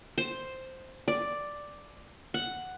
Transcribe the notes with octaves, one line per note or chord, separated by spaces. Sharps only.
C5
D5
F#5